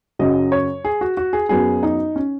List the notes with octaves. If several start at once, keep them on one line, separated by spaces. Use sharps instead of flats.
F#2 C#3 F#3 D#5
C#5
G#4
F#4
F#4
G#4
F#2 F#3 B3 G#4
D#4
C#4